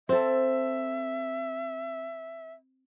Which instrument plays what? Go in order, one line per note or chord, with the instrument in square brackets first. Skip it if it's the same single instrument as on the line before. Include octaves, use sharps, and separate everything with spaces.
[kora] C4 A4 [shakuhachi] E5